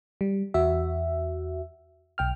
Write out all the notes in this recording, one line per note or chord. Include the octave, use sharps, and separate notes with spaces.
G3
E2 F#4 E5
B1 G5 F6